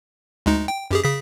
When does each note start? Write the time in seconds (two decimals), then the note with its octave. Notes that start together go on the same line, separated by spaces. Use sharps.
0.46 D2 G#3 D#4
0.68 G5
0.91 F#2 G4 G#4
1.04 C#3 G#4 B6